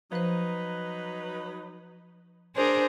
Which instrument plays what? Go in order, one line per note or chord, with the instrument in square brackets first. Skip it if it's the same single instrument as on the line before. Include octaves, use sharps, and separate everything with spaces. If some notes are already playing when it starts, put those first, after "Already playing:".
[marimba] F3 C5 [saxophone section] F#3 D#4 B4
[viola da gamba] D4 G#4 A#4 [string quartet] C5